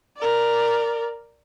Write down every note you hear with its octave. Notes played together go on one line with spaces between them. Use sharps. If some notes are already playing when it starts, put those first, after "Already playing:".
A#4 D5